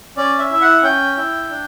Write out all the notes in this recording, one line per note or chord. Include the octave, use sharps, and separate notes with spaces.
C#4 D5
E5
E4
F#5
C#4 G5
E4
D4